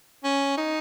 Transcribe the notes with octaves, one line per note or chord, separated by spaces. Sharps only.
C#4
D#4